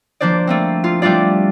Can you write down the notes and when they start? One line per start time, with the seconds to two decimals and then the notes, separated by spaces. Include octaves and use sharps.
0.21 F3 A#3 D4 C5 D5
0.47 A3 A#3 C4
0.84 F4
1.02 G3 A3 D4 F4 D5